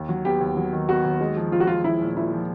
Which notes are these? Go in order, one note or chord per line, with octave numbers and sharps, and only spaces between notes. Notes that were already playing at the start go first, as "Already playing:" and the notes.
Already playing: D#2
F#3
B3 G4
D#2
F#3
D#3
B3 F#4
D#2
G#3
F3
F3 F4
F#4
F3 F4
F3 E4
A#2
A#2 E4
F3